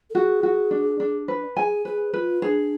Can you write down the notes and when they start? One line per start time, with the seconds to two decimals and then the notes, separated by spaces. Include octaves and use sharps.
0.10 A4
0.15 F#4 G#4
0.43 F#4
0.71 D4
1.00 D4
1.28 B4
1.57 G#4 G#5
1.85 G#4 B4
2.13 F4 B4
2.42 D4 G#4